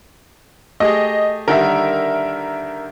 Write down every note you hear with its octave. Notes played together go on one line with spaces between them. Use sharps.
A3 G4 G#4 D#5
D3 D#3 G3 A#4 E5